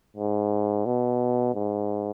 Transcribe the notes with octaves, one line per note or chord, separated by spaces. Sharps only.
G#2
B2
G#2